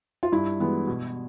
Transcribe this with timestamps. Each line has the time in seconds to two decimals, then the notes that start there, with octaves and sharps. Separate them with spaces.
0.23 F4
0.32 G2 E4
0.60 E3 G#3 B3
0.87 B2